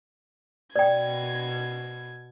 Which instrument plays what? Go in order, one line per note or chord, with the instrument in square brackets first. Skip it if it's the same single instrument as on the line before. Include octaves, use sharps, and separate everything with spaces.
[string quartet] B2 G#6 [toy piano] D5 G5